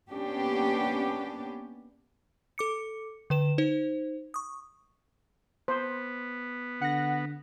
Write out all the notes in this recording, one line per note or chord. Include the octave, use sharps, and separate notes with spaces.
A#3 B3 C#4 D4 G4
A4 D6 C#7
D3 B4 E7
D#4 C5
C#6 D#6
B3 C5
D3 F#5 A#6